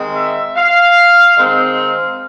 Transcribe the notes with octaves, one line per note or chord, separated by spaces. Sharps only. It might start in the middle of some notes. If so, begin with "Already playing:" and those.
Already playing: D#3 G#3 C4
E5
F5
D#3 G#3 C4 D#4 F5